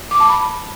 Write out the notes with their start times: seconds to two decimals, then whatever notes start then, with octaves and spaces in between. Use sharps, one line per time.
0.11 D6
0.20 A5
0.29 B5